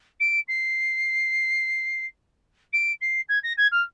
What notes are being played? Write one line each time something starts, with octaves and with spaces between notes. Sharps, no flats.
D7
C7
D7
C7
G#6
A#6
G#6
F6